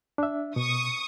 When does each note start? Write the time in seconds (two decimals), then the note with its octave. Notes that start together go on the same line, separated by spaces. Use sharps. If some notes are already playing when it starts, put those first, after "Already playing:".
0.18 D4 E5
0.56 B2 C#6 D#6